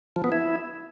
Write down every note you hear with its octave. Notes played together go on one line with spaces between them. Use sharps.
F3
B3
E4